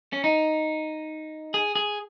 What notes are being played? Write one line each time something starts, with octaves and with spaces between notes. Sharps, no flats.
C#4
D#4
G#4
G#4